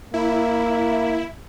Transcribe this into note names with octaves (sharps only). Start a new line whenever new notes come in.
A#3 E4